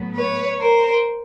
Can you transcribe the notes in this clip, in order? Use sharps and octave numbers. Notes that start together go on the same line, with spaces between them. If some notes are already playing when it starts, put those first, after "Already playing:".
Already playing: A2 F#3 B3
B4 C#5
A#4 C5